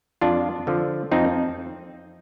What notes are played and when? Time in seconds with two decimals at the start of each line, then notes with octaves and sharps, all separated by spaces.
0.21 F2 D4 F4
0.67 D3 F3
1.12 F2 C4 D#4